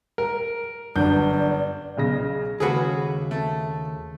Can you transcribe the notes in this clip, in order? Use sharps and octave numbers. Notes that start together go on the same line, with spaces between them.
A#4
G1 F#2 D4 D5 G6
B1 C#3 A#6
D#2 C#3 G#3 F#4 G#4 B4
A3